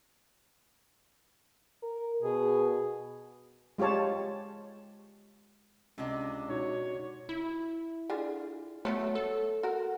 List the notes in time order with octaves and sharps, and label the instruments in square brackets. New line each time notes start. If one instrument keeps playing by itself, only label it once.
[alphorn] A#4
[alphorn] B2 [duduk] G#4
[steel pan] G#3 F4 G4 C#5 A5
[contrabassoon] C#2 [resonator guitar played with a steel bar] C3 D4 D#5
[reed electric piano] B2 D#4 F#4 [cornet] C#5
[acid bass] E4
[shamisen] D3 F4 G#4
[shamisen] F#3 B3 C#5 [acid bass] A3
[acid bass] A4
[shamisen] F#4 A#4